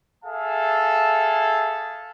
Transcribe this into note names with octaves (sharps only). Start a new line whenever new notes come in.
G#4 A4 E5 F5 A5